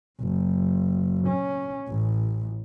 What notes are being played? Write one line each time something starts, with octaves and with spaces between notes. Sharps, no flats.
F#1
C#4
A1